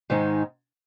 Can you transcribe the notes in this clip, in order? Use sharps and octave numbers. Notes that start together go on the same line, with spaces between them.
G#2 D#3 G#3 D#4